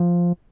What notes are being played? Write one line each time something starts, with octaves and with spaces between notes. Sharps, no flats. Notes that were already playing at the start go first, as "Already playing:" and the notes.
Already playing: F3